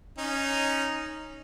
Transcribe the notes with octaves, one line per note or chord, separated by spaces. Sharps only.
C#4 D#4